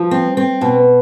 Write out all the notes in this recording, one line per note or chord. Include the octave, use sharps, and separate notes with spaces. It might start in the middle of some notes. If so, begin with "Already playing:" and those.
Already playing: F3
C4
C4
B2